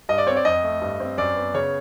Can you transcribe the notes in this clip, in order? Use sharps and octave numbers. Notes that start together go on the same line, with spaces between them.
G2 D#5
D5
C4 C#5
D5
F2 D#5
A3
G2
C4
F#2 D5
B3
C#3 C#5